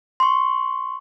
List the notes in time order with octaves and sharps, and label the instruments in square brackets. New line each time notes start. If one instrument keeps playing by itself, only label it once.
[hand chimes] C6 C#6